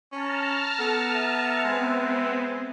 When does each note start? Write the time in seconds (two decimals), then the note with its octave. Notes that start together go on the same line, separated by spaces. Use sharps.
0.12 C#4 A5 A#5 F6
0.79 B3 A4
1.14 E5
1.64 G#3 B3 C4